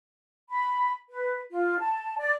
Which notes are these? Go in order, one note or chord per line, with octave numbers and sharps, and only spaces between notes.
B5
B4
F4
A5
D5